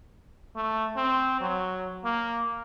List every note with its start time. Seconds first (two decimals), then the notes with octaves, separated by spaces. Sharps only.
0.56 A3
0.96 C4
1.41 F#3
2.04 A#3